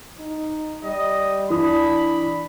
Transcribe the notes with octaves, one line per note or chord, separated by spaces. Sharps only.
D#4
G3 D#5
E3 D4 B5 D#6